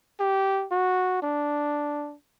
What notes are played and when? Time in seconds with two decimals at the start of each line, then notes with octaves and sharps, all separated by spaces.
0.20 G4
0.71 F#4
1.22 D4